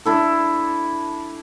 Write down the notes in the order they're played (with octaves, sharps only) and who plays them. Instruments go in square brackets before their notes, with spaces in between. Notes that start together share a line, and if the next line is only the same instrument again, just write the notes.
[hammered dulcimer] D4 E4 A4